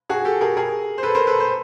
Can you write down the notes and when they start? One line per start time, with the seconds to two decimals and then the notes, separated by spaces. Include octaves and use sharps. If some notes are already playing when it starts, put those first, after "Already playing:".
0.09 F#4 G#4
0.25 G4 A4
0.41 G#4 A#4
0.57 G#4 A#4
0.98 C5
1.03 A4 B4
1.15 A#4 C5
1.27 A4 B4
1.40 C5